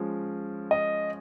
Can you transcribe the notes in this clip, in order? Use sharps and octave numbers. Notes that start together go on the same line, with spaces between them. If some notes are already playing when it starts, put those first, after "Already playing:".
Already playing: F3 G#3 C#4
D#5